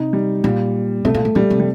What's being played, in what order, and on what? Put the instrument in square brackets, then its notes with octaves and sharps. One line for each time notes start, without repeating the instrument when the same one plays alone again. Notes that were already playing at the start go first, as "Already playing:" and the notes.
Already playing: [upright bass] C3 [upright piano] D#4
[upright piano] G3
[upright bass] A#2 [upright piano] G3
[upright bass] C3 [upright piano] A3
[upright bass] A#2
A2
[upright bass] A#2 [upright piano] G3
[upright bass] C3
[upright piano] G3